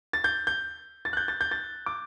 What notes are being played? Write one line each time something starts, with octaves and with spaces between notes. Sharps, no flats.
A6
G6
G6
A6
F#6
G6
A6
G6
A6
D6